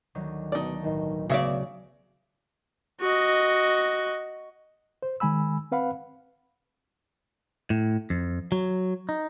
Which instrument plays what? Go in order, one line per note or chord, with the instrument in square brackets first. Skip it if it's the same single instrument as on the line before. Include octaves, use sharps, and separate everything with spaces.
[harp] D2 D#3 F#3
[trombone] B2 [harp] A3 [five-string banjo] D#4 D5
[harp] B1 A2 [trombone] D#3
[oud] C#3 D5 [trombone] B3 [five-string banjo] F#4 E5
[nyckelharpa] F#4 D#5
[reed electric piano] C5
D#3 G#3 G#5 B5 E6
C4 B4 F5 F#5 B5
[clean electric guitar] A2
F2
F#3
D#4